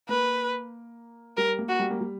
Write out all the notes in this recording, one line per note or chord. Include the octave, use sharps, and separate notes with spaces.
A#3 B4
G3 A#4
A#3
F#4
G3
A#3
G3